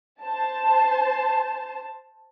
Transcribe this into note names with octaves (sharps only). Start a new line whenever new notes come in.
C5 A5